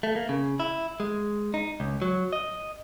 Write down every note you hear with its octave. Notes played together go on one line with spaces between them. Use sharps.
A3
A#3
C#3
E4
G#3
D#4
C#2
F#3
D#5